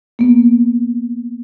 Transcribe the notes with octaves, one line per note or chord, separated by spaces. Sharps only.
A#3 B3